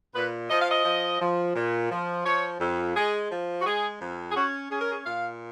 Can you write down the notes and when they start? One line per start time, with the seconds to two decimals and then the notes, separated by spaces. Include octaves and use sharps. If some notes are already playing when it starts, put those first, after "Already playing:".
0.15 A#2 B4
0.50 F3 D#5
0.61 F5
0.71 D#5
0.85 F3
1.21 F3
1.55 A#2
1.91 F3
2.25 F3 C#5
2.60 F2
2.95 G#3 G#4
3.31 F3
3.61 F#4
3.66 G#3 G#4
4.00 F2
4.30 G#4
4.35 C#4 F#4
4.70 C#4 G#4
4.81 A#4
4.91 G#4
5.06 A#2 F5